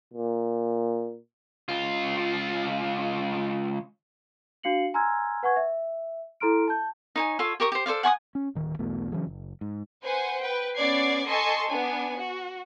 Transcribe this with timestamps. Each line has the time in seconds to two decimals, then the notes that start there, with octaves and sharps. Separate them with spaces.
0.14 A#2
1.69 C#2 F4
4.63 D4 F#4 F5 C7 C#7 F#7
4.94 G#5 A#5 C6 E6 F6 G#6
5.43 B4 F#5 G#5 C#6 G#6
5.56 E5
6.40 E4 A4 A#5 C6 F6 D7
6.68 A5 G6
7.16 D#4 C#5 G#5
7.39 F4 A4 C#5
7.60 G4 A#4 C#6 D#6
7.72 G4 C5
7.86 A4 C5 D5 F5
8.03 F#5 G#5 C#6 D#6
8.35 C#4
8.55 D1 D#3
8.79 B1 E2 B2 A3
9.12 C#3 E3 F#3 G#3
9.27 F#1
9.61 G#2
10.03 B4 C5 F#5 G#5
10.41 B4 G5
10.77 B3 C#4 D5 D6 G#6 C7
11.26 A4 D#5 G#5 A5 C6 C#6
11.68 B3 D4 G#5
12.16 F#4